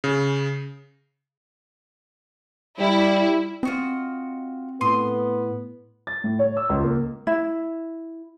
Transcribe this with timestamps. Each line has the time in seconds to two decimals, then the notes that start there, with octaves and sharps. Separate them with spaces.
0.04 C#3
2.79 G3 E4
3.63 C4 F4 F#4 D#5
4.81 A2 B3 C6 D#6
6.07 A6
6.24 A2
6.39 C#5
6.57 E6
6.69 C#2
6.83 A#3
7.27 E4